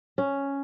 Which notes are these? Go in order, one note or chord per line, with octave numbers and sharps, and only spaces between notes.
C#4